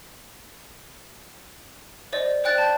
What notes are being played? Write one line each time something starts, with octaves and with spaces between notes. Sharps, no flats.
C5 D5 D#5
C5 D5 G5 F#6 A6
A5 G6